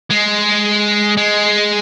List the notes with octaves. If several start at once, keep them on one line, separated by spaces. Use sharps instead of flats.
G#3
G#3